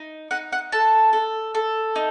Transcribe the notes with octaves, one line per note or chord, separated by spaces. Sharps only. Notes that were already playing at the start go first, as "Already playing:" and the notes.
Already playing: D#4
D#4 F#5
F#5
A4 A5
A4
A4
D#4